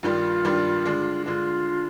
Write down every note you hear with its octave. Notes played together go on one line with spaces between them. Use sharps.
G2 D#3 G3 D4 F4
G2 D#3 G3 D4
D3 G#3 D4
D3 G#3 D4 F4